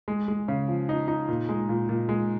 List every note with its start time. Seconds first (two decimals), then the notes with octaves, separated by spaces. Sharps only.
0.08 G#3
0.28 G#3
0.48 C#3
0.68 F3
0.89 D#4
1.08 D#4
1.28 A#2
1.49 G#3
1.69 A#2
1.89 A#2
2.09 G#3